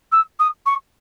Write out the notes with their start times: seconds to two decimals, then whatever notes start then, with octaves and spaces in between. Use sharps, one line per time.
0.12 E6
0.39 D#6
0.66 C#6